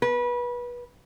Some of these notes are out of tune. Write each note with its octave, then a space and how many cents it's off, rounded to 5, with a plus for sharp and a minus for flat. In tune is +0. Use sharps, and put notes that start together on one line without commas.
B4 -25